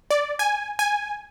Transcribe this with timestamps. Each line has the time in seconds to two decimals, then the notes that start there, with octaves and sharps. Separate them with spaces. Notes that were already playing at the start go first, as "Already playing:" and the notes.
0.11 D5
0.39 G#5
0.79 G#5